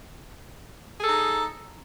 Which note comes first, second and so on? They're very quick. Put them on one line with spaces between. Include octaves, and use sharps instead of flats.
G#4 A4 D#4